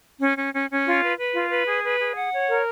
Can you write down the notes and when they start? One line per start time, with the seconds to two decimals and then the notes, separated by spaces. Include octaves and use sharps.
0.20 C#4
0.36 C#4
0.53 C#4
0.69 C#4
0.86 F4
1.02 B4
1.18 B4
1.34 F4
1.50 B4
1.67 G#4
1.83 B4
1.99 G#4
2.15 F#5
2.32 C#5
2.48 A#4